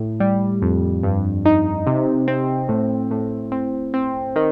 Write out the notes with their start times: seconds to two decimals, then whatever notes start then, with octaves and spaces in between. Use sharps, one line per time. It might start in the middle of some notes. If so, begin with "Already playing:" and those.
Already playing: A2
0.20 G3
0.62 F2
1.03 G2
1.45 D#4
1.87 C3
2.28 C4
2.69 A2
3.11 A2
3.52 C4
3.94 C4
4.36 D#3